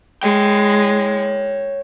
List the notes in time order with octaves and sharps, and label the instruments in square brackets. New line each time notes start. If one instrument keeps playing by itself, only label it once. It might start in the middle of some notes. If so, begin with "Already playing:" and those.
[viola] G#3 [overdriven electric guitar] C#5 G5